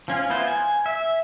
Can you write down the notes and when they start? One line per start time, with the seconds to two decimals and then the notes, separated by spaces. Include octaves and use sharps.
0.08 F3 C#4 F4
0.30 B3 E4 F4 C5
0.48 G#5
0.86 E5